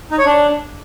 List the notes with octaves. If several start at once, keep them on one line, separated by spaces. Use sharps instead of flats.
D#4
C#5
D4